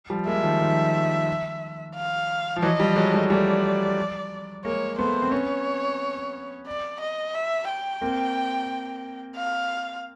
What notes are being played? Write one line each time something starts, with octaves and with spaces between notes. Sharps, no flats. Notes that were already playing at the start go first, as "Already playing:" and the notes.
F3 G3
G#3 A#3 E5
D#3 F3
D#3 F3
F5
F3
E3 F#3 D#5
F3 G3
F#3 G#3
G3 A3
G3 A3 D5
G#3 A#3 C#5
A3 B3 C5
C4
B3 C#4 C#5
D5
D#5
E5
G5
A#3 C4
F5